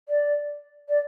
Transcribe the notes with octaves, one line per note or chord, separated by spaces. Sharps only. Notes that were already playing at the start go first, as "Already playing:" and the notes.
D5
D5